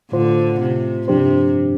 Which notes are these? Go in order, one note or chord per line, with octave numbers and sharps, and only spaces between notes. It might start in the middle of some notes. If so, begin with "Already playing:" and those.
A2 D3 A3 F4 C5
C3
G2 C3 F3 D4 G4 C5